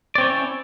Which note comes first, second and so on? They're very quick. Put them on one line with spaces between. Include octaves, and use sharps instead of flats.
D5 C4 C#5 E4 C#4